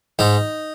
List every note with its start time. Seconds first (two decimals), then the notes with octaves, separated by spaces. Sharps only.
0.19 G#2 D#4